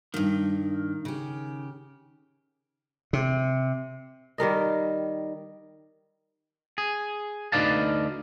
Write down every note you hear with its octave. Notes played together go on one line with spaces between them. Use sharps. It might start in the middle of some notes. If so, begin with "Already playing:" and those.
G2 D#3 A#3
C#3 G4
C3
D#3 G3 A#4 D#5
G#4
D2 D#4 B4 D5 F5 A5